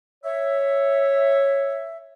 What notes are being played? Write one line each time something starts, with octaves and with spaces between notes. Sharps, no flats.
C#5 E5